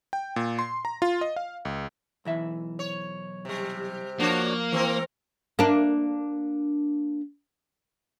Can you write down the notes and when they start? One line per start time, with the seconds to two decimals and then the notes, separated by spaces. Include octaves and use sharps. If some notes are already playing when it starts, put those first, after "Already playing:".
0.13 G5
0.36 A#2
0.59 C6
0.85 A#5
1.02 F4
1.21 D#5
1.36 F5
1.65 C#2
2.25 B1 E3 E5
2.79 C#5
3.45 C3 G3
4.20 F3 A#3 D4 F#4 C#5
4.72 E3 C4 A#4
5.59 A#3 D4